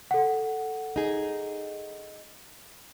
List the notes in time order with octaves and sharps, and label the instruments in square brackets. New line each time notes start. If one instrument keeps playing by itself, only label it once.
[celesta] A4 F#5
[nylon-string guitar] D#4 G#4